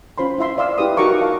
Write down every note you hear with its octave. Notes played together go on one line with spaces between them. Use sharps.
C#4 F4 C5 B5 C6
E4 F4 E5 C6
E4 D5 F5 C6 E6
E4 G4 B4 D#6
D#4 F#4 A#4 A#5 C#6 D6
F4 F5 A5